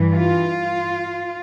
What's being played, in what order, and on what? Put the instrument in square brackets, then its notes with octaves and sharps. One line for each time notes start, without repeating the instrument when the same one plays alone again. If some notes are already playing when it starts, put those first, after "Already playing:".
Already playing: [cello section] G2 E3
F4